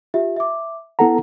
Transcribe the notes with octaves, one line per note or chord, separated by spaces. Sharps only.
F4 G4 E5
E5 D6
B3 E4 A4 F#5 A#5